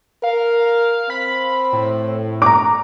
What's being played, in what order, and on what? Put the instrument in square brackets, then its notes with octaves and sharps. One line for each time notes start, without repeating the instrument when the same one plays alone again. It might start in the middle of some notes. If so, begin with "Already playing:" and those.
[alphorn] A#4 [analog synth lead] F5
[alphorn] C4 [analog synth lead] B5
[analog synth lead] A2
[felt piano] A#5 D6